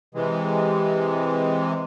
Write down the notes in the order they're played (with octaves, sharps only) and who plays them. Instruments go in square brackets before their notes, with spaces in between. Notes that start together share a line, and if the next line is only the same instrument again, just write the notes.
[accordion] C3 E3 G#3